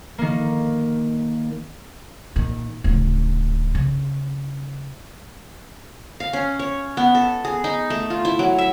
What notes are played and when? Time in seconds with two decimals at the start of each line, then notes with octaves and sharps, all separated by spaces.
0.18 D#3 A#3
2.36 A#2 D#3
2.84 D1 C#3
3.75 C#3
6.20 F5
6.33 C#4
6.59 C#5
6.97 B3
7.15 A4
7.45 G#4
7.64 D#4
7.90 A3
8.10 F4
8.25 E4
8.39 F#3
8.58 E5